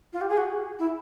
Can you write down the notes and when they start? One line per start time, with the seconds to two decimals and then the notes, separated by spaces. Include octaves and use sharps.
0.13 F4
0.21 G4
0.29 G#4
0.37 F#4
0.79 E4